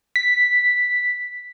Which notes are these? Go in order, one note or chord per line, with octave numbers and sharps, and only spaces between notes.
B6